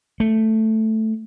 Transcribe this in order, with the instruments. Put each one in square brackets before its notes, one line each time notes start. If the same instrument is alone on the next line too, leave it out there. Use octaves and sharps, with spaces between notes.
[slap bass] A3